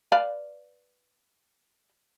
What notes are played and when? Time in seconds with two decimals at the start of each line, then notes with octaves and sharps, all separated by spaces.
0.12 B4 D5 F5